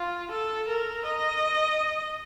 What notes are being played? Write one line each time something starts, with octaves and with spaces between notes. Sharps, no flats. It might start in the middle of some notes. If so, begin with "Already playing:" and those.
Already playing: F4
A4
A#4
D#5